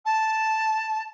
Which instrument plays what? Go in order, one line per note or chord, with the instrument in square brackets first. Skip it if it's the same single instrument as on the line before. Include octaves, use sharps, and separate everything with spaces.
[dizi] A5